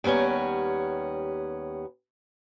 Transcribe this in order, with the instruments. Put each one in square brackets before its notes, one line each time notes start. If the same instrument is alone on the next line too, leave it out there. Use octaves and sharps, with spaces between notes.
[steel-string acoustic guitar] D#2 G3 B3 C#4 A#4